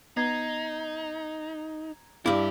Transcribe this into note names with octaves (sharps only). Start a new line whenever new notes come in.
B3 D#4 A#5 G#6 C7
G2 G3 D4 E4 G4 D5 D6